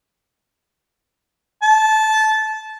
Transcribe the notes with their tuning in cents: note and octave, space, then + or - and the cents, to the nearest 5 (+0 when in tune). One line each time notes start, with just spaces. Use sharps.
A5 -15